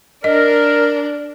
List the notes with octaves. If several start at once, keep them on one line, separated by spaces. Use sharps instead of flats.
D4 A#4 D#5